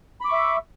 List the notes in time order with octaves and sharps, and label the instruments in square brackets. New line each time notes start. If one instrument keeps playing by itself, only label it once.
[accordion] B5
D6
C#6
E5